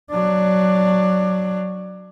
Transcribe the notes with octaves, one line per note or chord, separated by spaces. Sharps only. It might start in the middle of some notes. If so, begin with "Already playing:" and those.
F#3 D4